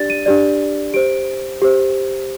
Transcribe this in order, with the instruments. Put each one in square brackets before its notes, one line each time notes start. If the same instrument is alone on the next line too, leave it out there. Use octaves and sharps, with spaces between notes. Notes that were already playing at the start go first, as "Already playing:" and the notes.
Already playing: [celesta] D4 G4 D5 A6
D#7
D4 G4 D5
G4 C5 D7
G4 C5